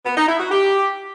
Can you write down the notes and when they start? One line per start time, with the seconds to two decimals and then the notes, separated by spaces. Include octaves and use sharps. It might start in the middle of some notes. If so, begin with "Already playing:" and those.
0.05 B3
0.17 D#4
0.28 E4
0.40 F#4
0.51 G4